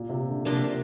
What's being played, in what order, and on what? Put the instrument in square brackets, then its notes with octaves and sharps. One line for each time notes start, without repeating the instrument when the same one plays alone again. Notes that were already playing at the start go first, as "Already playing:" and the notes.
Already playing: [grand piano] A#2
C3
D3
[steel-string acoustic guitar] C3 F3 A#3 D4 F4